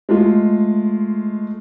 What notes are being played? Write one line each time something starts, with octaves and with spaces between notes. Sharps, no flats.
G#3 A3 F4